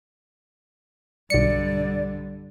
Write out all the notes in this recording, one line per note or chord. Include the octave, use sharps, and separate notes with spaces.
B1 G2 D3 D5 C#7